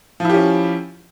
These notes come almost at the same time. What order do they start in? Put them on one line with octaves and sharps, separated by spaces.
F3 E4 G4 C#4